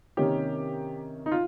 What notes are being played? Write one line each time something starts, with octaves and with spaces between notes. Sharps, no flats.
C3 D#3 A#3 C#4 G4
D#4
F4